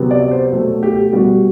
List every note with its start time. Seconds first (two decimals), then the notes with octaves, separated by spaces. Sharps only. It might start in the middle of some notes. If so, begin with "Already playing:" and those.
Already playing: C3 F#3 B3
0.11 D5
0.31 C5
0.52 B2 F#3 A3
0.83 G4
1.13 B2 G3 B3 F#4